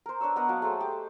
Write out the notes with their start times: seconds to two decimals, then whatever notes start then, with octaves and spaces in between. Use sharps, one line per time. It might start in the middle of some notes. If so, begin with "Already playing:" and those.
0.06 A#4 C5
0.21 D4 B4 C#5 E6
0.36 B3 A#4 D#5 F#5
0.49 F#3 A#3 A5
0.62 A3 G#4 A4 C5
0.81 G4